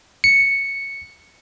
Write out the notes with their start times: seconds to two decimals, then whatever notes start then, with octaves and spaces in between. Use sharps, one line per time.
0.24 C#7